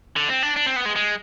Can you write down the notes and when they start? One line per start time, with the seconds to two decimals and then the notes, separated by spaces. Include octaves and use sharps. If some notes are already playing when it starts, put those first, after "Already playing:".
0.16 D3
0.29 C4
0.43 D4
0.56 D4
0.66 C4
0.76 B3
0.86 G#3
0.96 G#3